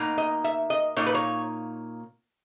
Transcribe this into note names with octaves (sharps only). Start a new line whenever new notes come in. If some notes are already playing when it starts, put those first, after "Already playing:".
Already playing: B2 A#3 D#4
D#5
E5
D#5
A#2 A#3 D#4 C#5
B4
C#5